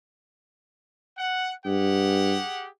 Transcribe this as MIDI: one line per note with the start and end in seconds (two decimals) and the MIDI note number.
1.17 1.53 78
1.66 2.37 43
1.66 2.68 67
1.66 2.68 68
1.66 2.68 78